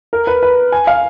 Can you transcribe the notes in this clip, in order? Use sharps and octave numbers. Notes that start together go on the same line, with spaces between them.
A#4
B4
B4
G#5
F5